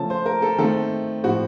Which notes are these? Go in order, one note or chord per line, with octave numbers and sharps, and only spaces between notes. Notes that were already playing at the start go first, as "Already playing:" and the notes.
Already playing: C#3 F3 A3 C#4 A5
C5
A#4
A4
D#3 A3 C4 A4
A2 F3 C4 F#4